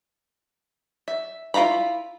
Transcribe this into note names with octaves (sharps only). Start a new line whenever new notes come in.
E5
E4 F4 F5 A#5 B5